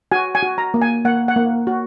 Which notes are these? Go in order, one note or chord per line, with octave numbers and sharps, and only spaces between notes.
F#4 G#5
G#5
F#4
A#5
A#3
G#5
A#3 F#5
F#5
A#3
F#4